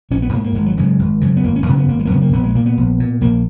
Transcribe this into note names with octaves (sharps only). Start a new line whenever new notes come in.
A#1 C#4
B3
G#2 A#3
A#3
G#1 G#3
F#3
F#2 C#3 G#3
G#1
F#2 C#3
B3
G#1 A#3
C#4
F#2 C#3 B3
B3
G#1 A#3
G#3
A#3
F#2 C#3 B3
A#3
A#1 B3
G#3
A#2 A#3
B3
A#1
A#2
A#1 A#3